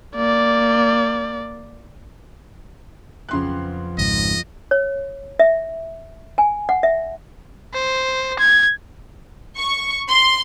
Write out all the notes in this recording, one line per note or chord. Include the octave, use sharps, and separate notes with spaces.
A#3 D5
F2 C#3 B3 C6 F#6
G#1 C#2 G#2 D#5
C#5
E5
G#5
F#5
E5
C5
G#6
C#6
C6